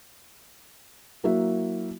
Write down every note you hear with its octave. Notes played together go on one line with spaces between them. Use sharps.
F#3 A#3 E4 F#4 E5